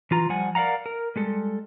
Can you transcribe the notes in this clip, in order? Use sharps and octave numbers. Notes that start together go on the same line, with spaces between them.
E3 F4 A#5
F3 G3 F#5 G#5
A#4 D5 F5 F#5 A#5
A#4
G3 G#3 A4